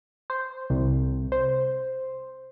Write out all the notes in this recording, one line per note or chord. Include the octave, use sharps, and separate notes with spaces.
C5
C2
C5